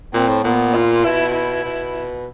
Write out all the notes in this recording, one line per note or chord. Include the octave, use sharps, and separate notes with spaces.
A#2 C4
A2
A#2 B3
F4
B2 E4
E4
B2